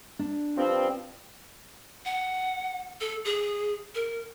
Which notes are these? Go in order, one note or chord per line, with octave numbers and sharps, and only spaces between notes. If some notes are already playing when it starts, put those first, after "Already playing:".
D4
G2 F3 C4
F#5
A4
G#4
A#4